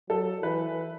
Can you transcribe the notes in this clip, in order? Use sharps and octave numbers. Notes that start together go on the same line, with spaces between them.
F#3 A4
E3 B4